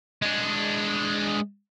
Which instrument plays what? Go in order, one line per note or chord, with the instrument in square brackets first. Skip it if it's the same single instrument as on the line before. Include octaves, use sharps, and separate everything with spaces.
[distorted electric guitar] G#3 D4